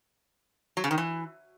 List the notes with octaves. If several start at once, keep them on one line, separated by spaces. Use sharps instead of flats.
F#3
C#3
D#3
E3